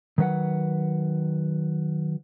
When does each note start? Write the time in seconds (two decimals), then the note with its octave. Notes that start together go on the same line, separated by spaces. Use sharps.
0.18 D#3 F#3 B4 D#5 F#5